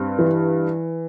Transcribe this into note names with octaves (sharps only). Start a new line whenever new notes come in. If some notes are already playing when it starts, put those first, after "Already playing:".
Already playing: G2 C4
E3